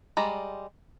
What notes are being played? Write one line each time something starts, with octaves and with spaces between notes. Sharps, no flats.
G3 G#3 D5 A#5